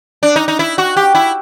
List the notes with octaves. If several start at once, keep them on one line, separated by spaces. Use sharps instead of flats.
D4
D#4
D#4
E4
F#4
G4
E4